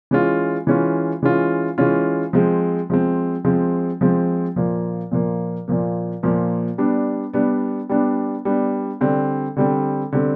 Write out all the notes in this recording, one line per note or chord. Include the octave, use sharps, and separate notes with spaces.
E3 G#3 C#4 F4
E3 G#3 C#4 F4
E3 G#3 C#4 F4
E3 G#3 C#4 F4
F3 G#3 C4
F3 G#3 C4
F3 G#3 C4
F3 G#3 C4
A#2 F3 A#3
A#2 F3 A#3
A#2 F3 A#3
A#2 F3 A#3
G3 B3 D4
G3 B3 D4
G3 B3 D4
G3 B3 D4
D3 G3 C4
D3 G3 C4
D3 G3 C4